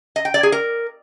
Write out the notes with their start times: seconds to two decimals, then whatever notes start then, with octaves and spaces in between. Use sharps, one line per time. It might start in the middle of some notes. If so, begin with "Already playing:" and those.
0.16 D#5
0.25 G5
0.34 D5
0.43 G#4
0.52 A#4